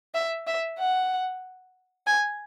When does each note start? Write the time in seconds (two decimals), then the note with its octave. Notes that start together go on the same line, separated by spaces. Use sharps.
0.15 E5
0.47 E5
0.79 F#5
2.07 G#5